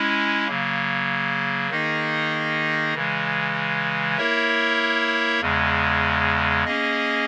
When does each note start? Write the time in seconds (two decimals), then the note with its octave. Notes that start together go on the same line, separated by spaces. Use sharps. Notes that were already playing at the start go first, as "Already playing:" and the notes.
Already playing: G#3 C#4 E4
0.47 C#3 F#3 A#3
1.70 D#3 A#3 D#4 G#4 D#5
2.94 C#3 E3 G#3
4.17 A#3 E4 A#4 C#5 E5
5.41 E2 C#3 G#3
6.65 A#3 C#4 G#4 D#5